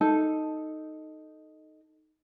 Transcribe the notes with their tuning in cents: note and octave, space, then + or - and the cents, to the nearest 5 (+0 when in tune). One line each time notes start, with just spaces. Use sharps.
D#4 +0 A4 +0